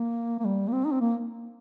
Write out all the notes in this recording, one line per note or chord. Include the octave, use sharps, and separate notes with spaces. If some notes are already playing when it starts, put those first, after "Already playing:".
Already playing: A#3
A#3
G3
A#3
C4
D#4
C4
A#3